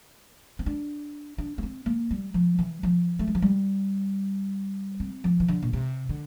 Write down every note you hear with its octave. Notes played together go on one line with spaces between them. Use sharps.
C4
D4
D4
A#3
C4
A#3
G3
F3
E3
F3
A3
G3
F3
G3
C4
F3
E3
D3
A#2
C3
D3